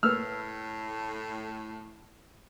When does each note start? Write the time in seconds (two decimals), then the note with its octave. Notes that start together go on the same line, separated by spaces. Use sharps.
0.03 A2 A3 A#3 B4 E6 F6